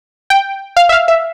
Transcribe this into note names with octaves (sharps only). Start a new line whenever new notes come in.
G5
F5
E5
F5
E5